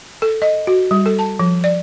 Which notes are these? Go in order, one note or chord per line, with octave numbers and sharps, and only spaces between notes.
A4
D#5
F#4
G3
A4
A5
F3
D5